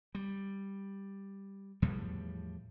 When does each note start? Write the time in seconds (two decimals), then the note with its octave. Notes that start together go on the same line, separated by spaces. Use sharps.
0.15 G3
1.82 E2 A2 F3 G3